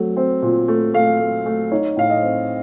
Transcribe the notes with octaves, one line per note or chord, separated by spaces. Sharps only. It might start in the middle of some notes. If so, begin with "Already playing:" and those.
Already playing: F#3 A3 C4
C4
A#2
A3
A3 F5
A3
A3
D#4 C#5
A2 F5
D#5
C4